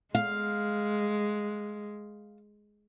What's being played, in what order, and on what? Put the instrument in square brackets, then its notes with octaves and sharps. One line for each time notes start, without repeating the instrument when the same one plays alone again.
[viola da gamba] G#3 [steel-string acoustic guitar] F5